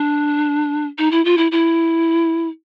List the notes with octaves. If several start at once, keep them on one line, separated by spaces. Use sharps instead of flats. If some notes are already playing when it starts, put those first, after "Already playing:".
Already playing: D4
D#4
E4
F4
E4
E4